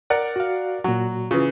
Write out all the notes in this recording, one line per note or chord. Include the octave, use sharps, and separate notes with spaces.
A#4 D5 F#5
F#4 F5
A#2 F#3 F#4
C#3 E3 F4